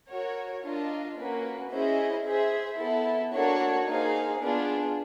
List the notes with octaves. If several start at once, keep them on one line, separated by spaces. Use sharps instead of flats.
F#4 A#4 C#5
D4 F4 A#4 D#5
A#3 C#4 F#4 B4
C#4 E4 G#4 C5 D#5
G#4 C5 E5
B3 E4 A4
A#3 D4 F#4 A4 C#5
A#3 D#4 G#4 C5 F5
B3 D4 F4 G#4